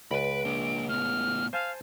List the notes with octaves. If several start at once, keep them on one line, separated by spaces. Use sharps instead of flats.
C#2 B4 B5 D7
A#3 D4
A2 B3 F6
C5 F5 G#5 A5